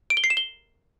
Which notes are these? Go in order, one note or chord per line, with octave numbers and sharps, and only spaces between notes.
D7
G7
C7
E7
G7